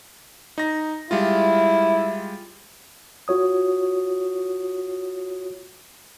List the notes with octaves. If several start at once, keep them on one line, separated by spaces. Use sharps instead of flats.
D#4 A#6
G3 G#3 E4 F4
F4 F#4 C#5 D#6